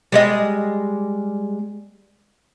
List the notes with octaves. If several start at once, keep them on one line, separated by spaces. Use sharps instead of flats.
G3 G#3 D#5